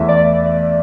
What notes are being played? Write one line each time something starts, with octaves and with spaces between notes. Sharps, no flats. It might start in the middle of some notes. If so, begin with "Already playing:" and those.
Already playing: E2 E3 A3 E5
D5